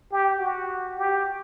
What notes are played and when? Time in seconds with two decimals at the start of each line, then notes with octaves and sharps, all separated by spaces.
0.11 G4
0.40 F#4
0.98 G4